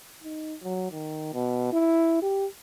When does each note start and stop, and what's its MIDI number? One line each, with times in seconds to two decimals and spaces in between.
0.23 0.55 63
0.62 0.87 54
0.92 1.32 51
1.34 1.69 47
1.73 2.21 64
2.22 2.46 67